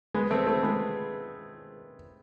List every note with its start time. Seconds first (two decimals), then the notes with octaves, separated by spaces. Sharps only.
0.14 G#3 B3
0.31 A3 C4
0.47 A3 C4
0.63 G#3 B3